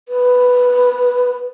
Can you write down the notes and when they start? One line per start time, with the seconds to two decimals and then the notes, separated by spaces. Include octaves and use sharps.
0.09 B4